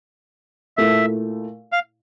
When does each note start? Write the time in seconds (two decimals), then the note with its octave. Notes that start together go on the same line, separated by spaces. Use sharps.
0.77 A#2 A3 E4 E5
1.72 F5